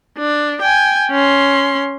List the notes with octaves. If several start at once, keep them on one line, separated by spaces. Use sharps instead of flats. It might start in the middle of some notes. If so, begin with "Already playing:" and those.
D4
G5 G#5
C#4 C6